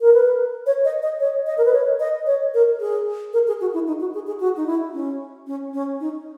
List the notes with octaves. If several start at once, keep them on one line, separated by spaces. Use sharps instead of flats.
A#4
B4
C#5
D#5
D#5
C#5
D#5
A#4
B4
C#5
D#5
C#5
A#4
G#4
A#4
G#4
F#4
E4
D#4
F#4
G#4
G#4
F#4
D#4
E4
C#4
C#4
C#4
D#4